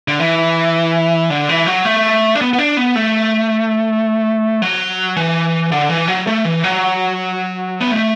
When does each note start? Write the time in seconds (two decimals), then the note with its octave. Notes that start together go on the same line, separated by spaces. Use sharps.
0.08 D3
0.20 E3
1.30 D3
1.49 E3
1.67 F#3
1.85 A3
2.35 D4
2.41 B3
2.53 B3
2.59 D4
2.77 B3
2.96 A3
4.62 F#3
5.17 E3
5.72 D3
5.89 E3
6.08 F#3
6.27 A3
6.45 E3
6.64 F#3
7.81 B3
7.92 A3